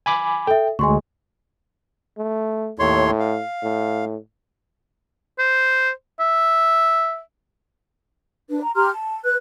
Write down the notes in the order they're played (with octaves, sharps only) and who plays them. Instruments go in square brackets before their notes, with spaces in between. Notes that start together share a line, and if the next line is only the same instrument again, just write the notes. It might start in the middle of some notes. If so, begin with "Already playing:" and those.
[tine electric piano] G#5 B5 D6
[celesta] A4 E5 [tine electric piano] G5
[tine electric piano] D2 G#3 [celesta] G#5 C6 C#6
[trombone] A3
[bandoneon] D#2 C#5 C6 [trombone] A2
[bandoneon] F5
[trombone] A2
[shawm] C5
E5
[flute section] D4 B4
A#5
G4 A#5 C6 F6
A5
B4 F#6